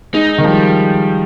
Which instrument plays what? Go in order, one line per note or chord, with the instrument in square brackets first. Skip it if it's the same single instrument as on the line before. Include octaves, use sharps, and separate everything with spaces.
[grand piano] G#3 [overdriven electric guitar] D#4
[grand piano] D#3
[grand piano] F3 [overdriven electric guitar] G3